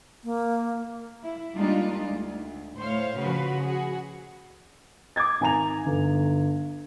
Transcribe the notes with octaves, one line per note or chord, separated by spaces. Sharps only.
A#3
E4
G3 G#3 A#3 D4 D#4 F4
D2
A2 C5 C#5 F5
C#3 F3 F#4 B4
F#4 G#4
D6 D#6 G#6 A6
G#1 G#5 A#5 F7
G1